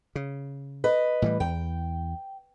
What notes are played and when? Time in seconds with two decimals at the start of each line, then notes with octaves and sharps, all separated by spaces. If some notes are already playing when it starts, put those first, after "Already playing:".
0.15 C#3
0.84 B4 D#5
1.22 A2 E3 G3
1.40 E2 G5